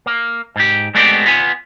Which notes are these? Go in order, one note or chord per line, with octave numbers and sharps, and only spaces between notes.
A#3
G#2 G4
G#3 A3 B3 C4 G4 D5
B3 F4 G#5